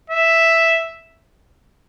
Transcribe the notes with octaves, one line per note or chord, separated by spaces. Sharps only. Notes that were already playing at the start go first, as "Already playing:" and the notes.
E5